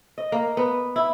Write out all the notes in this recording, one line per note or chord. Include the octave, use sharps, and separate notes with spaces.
D#5
A#3
B3
E4